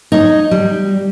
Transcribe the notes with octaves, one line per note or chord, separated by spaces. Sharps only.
D#4 C#5
G3